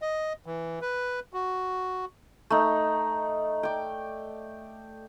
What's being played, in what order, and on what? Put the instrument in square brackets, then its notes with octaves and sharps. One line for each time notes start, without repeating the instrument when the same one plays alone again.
[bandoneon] D#5
E3
B4
F#4
[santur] A3 D#4
D5 G5